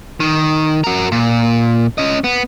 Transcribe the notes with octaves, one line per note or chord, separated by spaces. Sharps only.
D#3
F#4 A#4
A#2
C#4 D#5
B3